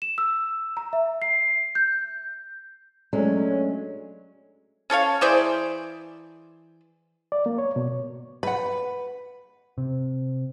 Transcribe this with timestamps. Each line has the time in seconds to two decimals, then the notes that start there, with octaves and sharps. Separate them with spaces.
0.02 E7
0.18 E6
0.77 A#5
0.93 E5
1.22 C7
1.75 G6
3.13 F#3 G#3 A3 C#4 D4
4.90 C#4 A4 C#5 F5
5.21 E3 G#4 C5 D5
7.32 D5
7.46 A#3
7.58 C#5
7.76 B2
8.43 B4 F#5 B5
9.78 C3